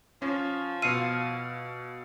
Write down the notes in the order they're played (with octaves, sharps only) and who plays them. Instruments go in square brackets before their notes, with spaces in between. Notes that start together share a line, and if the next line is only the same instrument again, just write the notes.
[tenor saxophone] F3 [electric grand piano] C#4
[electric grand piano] B2 F5 F6 [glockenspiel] E6 C7 C#7 [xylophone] D#7